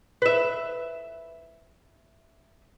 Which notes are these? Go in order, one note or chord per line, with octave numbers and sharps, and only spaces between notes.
B4 E5